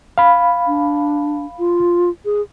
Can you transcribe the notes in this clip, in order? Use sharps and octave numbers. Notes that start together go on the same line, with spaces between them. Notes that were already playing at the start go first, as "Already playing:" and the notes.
F5 B5
D4
F4
G#4